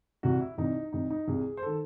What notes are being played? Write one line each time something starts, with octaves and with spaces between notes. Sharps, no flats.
C2 C3 E3 F#4
E4
C2 C3 E3 D#4
C2 C3 E3 D#4
D#4
C2 C3 E3 G#4
C5
D#3 A4